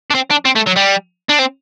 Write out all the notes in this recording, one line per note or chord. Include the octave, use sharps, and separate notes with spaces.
D4
C4
D4
C4
A3
F#3
G3
D4
C4